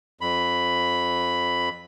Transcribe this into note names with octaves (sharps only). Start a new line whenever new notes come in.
F2 B5